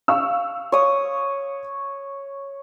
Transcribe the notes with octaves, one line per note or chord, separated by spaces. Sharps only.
F5 C#6 E6
C#5 D#6